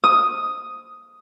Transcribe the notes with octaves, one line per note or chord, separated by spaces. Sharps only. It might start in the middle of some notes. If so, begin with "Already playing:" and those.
D#6